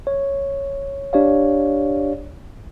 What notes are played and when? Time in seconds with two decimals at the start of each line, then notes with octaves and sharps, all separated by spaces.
0.07 C#5
1.13 D4 G4 C#5 D5 F5